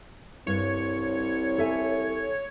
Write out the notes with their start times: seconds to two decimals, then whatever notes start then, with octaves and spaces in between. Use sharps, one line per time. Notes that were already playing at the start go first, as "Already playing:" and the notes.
0.47 C2 G2 C#5
1.58 A4 E5 G#5